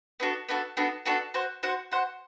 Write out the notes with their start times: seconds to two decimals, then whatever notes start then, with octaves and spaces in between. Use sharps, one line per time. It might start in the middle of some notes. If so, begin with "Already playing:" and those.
0.20 B3 D4 F#4 A4
0.49 B3 D4 F#4 A4
0.77 B3 D4 F#4 A4
1.06 B3 D4 F#4 A4
1.34 F#4 C5 F#5
1.63 F#4 C5 F#5
1.92 F#4 C5 F#5